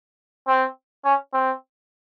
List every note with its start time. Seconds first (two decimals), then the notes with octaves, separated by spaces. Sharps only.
0.48 C4
1.05 C#4
1.33 C4